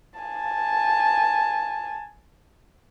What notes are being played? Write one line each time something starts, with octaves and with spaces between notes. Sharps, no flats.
G#5 A5